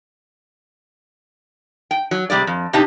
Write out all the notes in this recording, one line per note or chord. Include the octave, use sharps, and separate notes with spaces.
G5
F#3
C3 G3 G#3 D5
F2
C3 D4 D#4 G4 A5